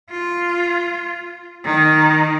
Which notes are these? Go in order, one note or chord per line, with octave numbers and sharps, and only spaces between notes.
F4
D#3